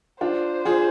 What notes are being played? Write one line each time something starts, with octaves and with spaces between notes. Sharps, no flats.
D4 F4 C5
F4 G#4